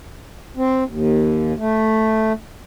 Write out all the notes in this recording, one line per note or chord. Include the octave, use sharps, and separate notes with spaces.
C4
D#2
A3